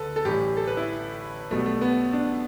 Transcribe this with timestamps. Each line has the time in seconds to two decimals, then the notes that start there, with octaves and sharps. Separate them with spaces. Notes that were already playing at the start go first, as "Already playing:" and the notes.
Already playing: D2 D3 A4 B4
0.16 A4
0.25 A1 A2 E3 G3 G4
0.57 A4
0.68 B4
0.77 E4
1.51 B1 B2 G3 A3
1.66 A3
1.81 B3
2.13 D4